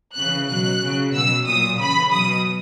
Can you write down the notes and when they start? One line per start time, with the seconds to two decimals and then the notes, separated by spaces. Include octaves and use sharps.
0.16 C#3 E3 F#6
0.49 B2 F#3 F#6
0.82 C#3 F#3
1.14 B2 F#3 E6
1.46 A#2 F#3 D#6
1.80 C#3 E3 B5
2.12 B2 F#3 D#6